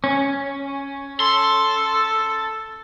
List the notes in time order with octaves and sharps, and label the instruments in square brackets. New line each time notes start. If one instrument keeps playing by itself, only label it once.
[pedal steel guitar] C#4
[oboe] A4 [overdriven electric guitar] C6